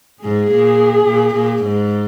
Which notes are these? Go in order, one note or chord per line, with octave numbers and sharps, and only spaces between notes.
G#2 G#4
A#2
A#2
A#2
G#2